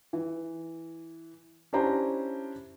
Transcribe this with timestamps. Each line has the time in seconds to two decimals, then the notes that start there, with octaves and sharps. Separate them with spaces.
0.13 E3
1.73 C#4 D4 E4 G4 C5 A#5